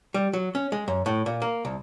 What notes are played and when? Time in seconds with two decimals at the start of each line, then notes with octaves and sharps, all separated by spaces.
0.14 G3
0.33 F#3
0.55 C#4
0.72 G#3
0.88 F#2
1.06 A2
1.26 A#2
1.42 A#3
1.65 C2